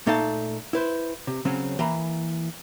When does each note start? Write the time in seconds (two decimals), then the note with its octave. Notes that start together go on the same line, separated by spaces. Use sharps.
0.07 A#2 A3 D#4 A4 F5 A5
0.73 E4 B4 C5
1.27 C3
1.45 C#3 F#3 C4 C#4
1.79 E3 A#3 A#5 B5